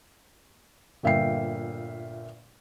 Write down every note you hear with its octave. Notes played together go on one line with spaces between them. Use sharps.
G1 A#2 E5 F5 G5 C7